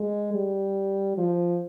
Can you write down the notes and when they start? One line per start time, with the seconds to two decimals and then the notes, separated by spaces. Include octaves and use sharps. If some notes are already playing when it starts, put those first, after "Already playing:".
Already playing: G#3
0.34 G3
1.18 F3